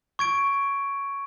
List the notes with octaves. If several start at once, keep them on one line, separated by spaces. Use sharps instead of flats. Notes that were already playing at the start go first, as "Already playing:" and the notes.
C#6 G#6 D7